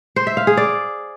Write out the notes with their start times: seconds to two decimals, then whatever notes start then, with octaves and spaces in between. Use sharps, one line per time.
0.16 C5
0.27 E5
0.37 F5
0.47 G#4
0.57 D5